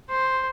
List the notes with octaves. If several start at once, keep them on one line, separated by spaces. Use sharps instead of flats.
C5